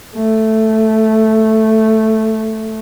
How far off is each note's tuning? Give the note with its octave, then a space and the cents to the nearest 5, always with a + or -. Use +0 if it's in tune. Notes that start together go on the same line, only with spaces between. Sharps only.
A3 +0